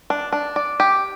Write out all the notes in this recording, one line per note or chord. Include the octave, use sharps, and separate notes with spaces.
D4
D4
D5
G4